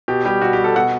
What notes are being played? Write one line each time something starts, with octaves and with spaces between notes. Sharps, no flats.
B2 G4
G3 G4
B2 F#4
G4
G3
A4
B2 F#5